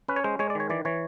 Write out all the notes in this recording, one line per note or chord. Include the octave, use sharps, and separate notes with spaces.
C#4 B4
C#5
G#3 C5
G#3 C#5
D5
D#3 C#5
E3 D5
E3 C#5